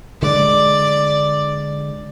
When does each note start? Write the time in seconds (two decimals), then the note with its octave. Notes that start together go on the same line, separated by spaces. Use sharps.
0.22 D3 G#3 D5